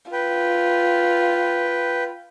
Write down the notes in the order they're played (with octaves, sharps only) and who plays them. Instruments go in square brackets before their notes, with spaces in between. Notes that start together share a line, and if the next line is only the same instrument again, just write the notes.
[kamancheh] F4 [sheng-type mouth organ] B4 G5